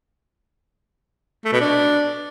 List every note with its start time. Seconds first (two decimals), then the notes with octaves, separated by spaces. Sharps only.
1.45 A3
1.52 B2
1.60 D4